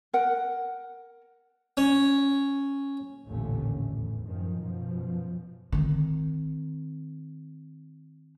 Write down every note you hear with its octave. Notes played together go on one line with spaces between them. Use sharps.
A#4 F#5
C#4
A1 D#2 A#2 D3 A3 C#4
E2 A2
F#2 D#3 F3
F#2 B2 F3
D#3 C4